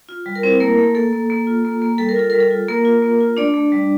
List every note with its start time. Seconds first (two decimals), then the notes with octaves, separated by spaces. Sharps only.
0.09 F4
0.26 G3
0.35 A#4
0.43 C4 E4 C5
0.60 A3 A#3 A#4
0.77 A3
0.95 A#3 A4
1.13 A#3
1.30 A#3
1.47 F4
1.65 A#3
1.82 A#3
1.98 G3 A4
2.09 A#4
2.16 F4 A4
2.30 G3 A#4
2.40 A4
2.51 F4
2.68 A#3 A#4
2.85 F4
3.02 A#3
3.20 F4
3.37 A3 D4 D5
3.54 A3
3.72 G3